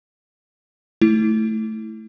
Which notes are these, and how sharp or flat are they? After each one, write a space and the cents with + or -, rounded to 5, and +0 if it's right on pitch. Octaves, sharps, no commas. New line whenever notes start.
A3 +0 E4 -10